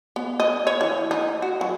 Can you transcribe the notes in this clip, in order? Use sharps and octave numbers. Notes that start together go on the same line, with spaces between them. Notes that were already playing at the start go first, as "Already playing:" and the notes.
B3
D#5
C#5
E3
D#4
F#4
F#3